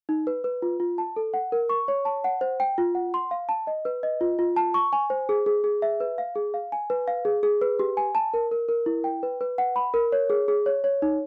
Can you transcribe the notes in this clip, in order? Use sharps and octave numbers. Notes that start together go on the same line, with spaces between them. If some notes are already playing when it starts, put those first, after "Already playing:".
D#4
B4
B4
F4
F4
A5
A4
F#5
A#4
C#6
C#5
A5
F#5
C5
G5
F4
F#5
C6
F5
A5
D#5
B4
D#5
F4
F4
A5
C#6
G#5
C5
G#4
G#4
G#4
E5
B4
F5
G#4
F5
G#5
B4
F5
G#4
G#4
B4
G4
G#5
A5
A#4
A#4
A#4
E4
G5
B4
B4
F#5
B5
A#4
C#5
G#4
G#4
C#5
C#5
D#4